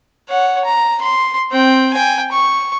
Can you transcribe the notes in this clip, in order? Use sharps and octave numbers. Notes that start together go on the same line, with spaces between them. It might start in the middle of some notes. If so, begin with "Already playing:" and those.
C#5 F#5
A#5
C6
C4 G5
G5 G#5
C#6